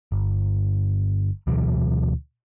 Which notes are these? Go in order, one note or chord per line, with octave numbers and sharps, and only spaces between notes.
G1
D2 B2 E3 F#3